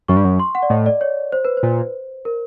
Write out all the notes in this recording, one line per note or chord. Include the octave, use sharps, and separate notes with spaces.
F#2 C#6
G2
F#2
C6
F#5
D5
A2 D#5
D5
C#5
C5
B4
C5
A#2
A#4